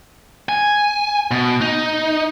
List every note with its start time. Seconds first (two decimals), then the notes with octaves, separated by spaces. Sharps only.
0.49 G#5
1.31 B2
1.61 D#4